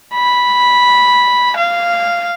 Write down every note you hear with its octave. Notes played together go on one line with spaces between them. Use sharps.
B5
F5